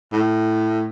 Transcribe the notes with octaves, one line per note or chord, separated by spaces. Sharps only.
A2